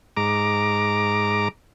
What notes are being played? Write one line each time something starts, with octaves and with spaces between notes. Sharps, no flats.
G#2 A#5 D6